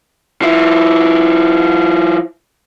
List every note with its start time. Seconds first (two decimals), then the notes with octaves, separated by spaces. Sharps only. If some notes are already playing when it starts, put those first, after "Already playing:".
0.42 F3 E4